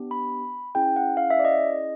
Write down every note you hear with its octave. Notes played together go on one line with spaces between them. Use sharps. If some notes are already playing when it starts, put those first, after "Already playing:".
Already playing: B3 D4 G4
B5
C#4 E4 G#4 G5
F#5
F5
E5
D5
D#5